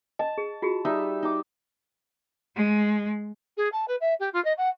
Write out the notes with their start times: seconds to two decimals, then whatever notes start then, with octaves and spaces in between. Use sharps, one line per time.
0.19 D#5 A5
0.38 G#4
0.62 F4 F#4 G#4
0.85 G3 D#4 E5
1.23 D#4 D6
2.56 G#3
3.57 G#4
3.72 A5
3.88 B4
4.00 E5
4.19 G4
4.33 F4
4.44 D#5
4.58 F#5